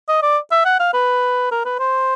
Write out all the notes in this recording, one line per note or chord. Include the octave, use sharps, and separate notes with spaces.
D#5
D5
E5
F#5
F5
B4
A#4
B4
C5